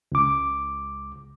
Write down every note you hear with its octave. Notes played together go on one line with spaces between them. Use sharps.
C#2 D6